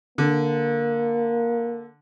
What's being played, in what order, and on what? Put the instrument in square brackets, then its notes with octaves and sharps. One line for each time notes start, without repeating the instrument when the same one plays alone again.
[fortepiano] D3 [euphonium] A#3